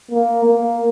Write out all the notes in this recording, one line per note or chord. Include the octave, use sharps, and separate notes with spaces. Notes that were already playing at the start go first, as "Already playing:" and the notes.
A#3
A#3